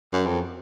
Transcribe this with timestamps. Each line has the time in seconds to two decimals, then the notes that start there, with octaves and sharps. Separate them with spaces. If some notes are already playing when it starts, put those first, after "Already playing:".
0.13 F#2
0.26 F2